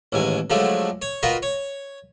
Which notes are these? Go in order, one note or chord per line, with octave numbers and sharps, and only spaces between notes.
A1 D#2 G#2 G#5
D3 F3 F#3 G#3 A3
C#5
F4 F#4 A#4 B4 D#5
C#5